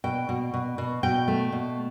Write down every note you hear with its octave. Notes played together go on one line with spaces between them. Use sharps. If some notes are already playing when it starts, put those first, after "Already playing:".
B2 G5
B2
B2
B2
B2 G5
A3
B2